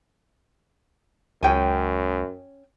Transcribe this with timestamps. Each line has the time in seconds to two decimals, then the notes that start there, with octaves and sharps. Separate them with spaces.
1.43 C#2 F#2 C#4 G5 G#5